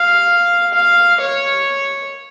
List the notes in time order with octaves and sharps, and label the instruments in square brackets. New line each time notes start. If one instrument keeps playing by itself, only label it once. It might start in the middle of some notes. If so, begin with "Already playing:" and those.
Already playing: [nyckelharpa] F5
F5
C#5